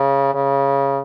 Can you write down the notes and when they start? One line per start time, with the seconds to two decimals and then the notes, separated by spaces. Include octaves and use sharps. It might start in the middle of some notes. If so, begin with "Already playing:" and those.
Already playing: C#3
0.34 C#3